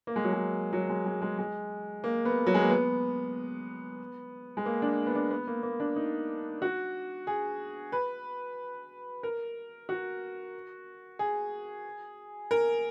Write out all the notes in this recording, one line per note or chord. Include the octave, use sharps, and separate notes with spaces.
A#3
G#3
F#3
G#3
F#3
G#3
G#3
G#3
G#3
A#3
B3
F#3
G#3
A#3
B3
G#3
A#3
D4
B3
D4
B3
A#3
A#3
D4
D#4
F#4
G#4
B4
A#4
F#4
G#4
A#4